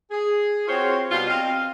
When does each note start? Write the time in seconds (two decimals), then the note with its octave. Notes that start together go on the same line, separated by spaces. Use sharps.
0.11 G#4
0.68 C4 F4 F#4 C5 C#5
1.11 B2 G3 F4
1.27 C4 D#5 F5